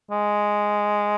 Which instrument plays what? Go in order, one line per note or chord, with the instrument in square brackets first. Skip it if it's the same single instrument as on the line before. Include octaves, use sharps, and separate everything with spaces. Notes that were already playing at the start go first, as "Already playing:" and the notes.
[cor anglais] G#3